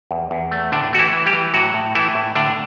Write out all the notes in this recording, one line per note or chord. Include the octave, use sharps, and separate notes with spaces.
E2
E2
A3
A2 D3 D4
A3 F#4
E3 E4
E3
G3 G4
E3
A2 F#3 F#4
A2
E3 A3 E4
A2
A2 D3 D4